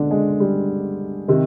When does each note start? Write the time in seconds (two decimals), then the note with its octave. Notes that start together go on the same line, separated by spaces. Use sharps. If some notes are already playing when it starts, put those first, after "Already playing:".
Already playing: C#2 B2 D3 D4
0.11 G#3
0.40 G3
1.28 C3 D#3